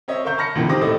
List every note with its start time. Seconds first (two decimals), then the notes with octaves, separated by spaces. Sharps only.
0.08 C4 C#5 D#5 E5
0.24 A#4 E5 F5 C#6 G6
0.38 A5 B5 F6 A#6 C#7
0.55 C#2 A#2 D3 E3
0.69 D#3 C4 G4 D6 D#6 A#6
0.81 D#1 A2 A3 E4 D5 D#5